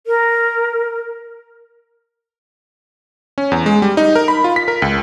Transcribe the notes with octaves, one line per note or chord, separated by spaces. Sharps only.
A#4
C#4
E2
G#3
G3
D#4
A#4
B5
F4
B6
A#4
C#2